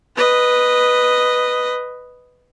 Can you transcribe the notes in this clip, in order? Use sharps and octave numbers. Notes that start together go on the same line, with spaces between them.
B4 D#5